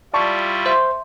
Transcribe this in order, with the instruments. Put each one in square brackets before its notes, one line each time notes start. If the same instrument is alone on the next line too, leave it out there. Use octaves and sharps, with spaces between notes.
[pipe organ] G3 E4 F4 [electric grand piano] D5 A5 C#6
[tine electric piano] C5 [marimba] E5 C6